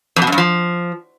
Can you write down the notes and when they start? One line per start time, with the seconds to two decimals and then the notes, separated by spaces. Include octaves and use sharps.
0.16 F2
0.22 B2
0.27 F#2
0.32 G2
0.38 F3